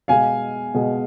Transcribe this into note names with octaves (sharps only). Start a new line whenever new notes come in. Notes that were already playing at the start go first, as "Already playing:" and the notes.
B2 G#3 F5 G#5
B2 G#3